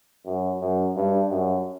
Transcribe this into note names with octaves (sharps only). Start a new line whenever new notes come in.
F#2
F#2
G2
F#2